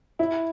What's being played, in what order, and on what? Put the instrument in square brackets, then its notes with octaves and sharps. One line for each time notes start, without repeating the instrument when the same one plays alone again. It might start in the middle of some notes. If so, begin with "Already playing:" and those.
[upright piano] E4